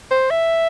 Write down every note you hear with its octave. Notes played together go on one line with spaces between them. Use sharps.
C5
E5